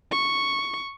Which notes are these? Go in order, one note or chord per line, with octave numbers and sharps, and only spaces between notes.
C#6